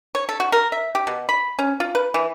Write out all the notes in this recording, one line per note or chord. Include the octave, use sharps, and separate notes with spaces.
C#5
A4
F#4
A#4
E5
G4
B2
B5
C#4
F4
B4
E3